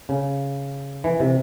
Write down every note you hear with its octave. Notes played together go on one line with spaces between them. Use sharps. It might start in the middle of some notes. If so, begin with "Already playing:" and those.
C#3
E3
C3